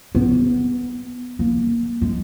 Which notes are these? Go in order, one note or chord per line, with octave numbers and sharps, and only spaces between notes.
B3
A#3
G#3